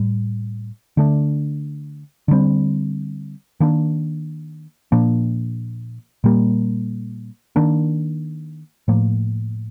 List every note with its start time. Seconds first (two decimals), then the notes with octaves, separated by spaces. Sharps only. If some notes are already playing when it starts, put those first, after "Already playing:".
Already playing: A2 G3
0.97 D3 A3 D4
2.28 D3 G3 C4
3.60 D#3 A#3 D4
4.92 A#2 F3 A#3 D4
6.24 A#2 G3 A#3
7.56 D#3 A#3 D4
8.88 A2 F3 A#3